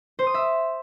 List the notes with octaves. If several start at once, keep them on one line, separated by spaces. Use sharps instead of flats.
C5
D#6
E5